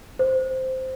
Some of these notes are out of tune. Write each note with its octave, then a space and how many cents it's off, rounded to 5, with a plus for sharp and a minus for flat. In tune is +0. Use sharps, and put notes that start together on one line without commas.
C5 -5